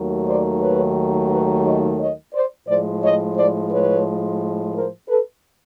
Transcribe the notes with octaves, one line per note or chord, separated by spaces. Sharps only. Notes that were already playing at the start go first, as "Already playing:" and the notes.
Already playing: D#2 D#3 F#3 A3
C5 D5
B4 C#5
B4 C#5
C#5 D#5
C#5 D#5
C5 D5
A2 F3 G#3 C5 D5
C#5 D#5
C5 D5
B4 C#5
A#4 C5
A4 B4